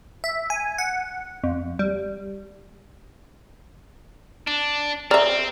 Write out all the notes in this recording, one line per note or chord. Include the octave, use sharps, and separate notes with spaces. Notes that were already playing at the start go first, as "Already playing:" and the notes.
E5
G#5
F#5
F2
G3
D4 E7
C4 D5 E5 A#5 F6